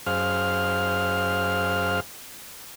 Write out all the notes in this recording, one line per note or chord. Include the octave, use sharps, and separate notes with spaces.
F#2 G#4 C5 F5 F6